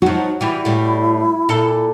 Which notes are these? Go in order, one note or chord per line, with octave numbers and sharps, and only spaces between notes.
F3 F#3 D#4 F#4
E3 G3 E4
A2 G3
A#2 A4